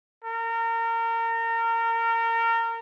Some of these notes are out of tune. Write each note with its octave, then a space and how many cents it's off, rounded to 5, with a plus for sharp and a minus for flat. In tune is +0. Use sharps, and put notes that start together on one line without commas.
A#4 -30